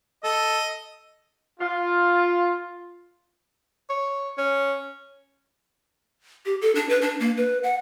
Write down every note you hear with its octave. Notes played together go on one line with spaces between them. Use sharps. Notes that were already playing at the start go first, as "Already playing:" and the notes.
A4 D#5
F4
C#5
C#4
G4
A4
D4
B4
D4
A#3
B4
F#5